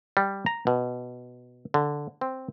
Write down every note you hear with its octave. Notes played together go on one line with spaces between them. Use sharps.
G3
A#5
B2
D3
C4